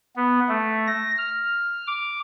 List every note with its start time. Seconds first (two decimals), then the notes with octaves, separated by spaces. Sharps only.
0.16 B3
0.48 A3
0.87 A#6
1.18 F6
1.87 D6